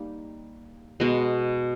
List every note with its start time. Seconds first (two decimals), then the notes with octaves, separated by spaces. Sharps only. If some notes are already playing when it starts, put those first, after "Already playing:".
Already playing: G3 A#3 D#4
1.00 B2 G#3 B3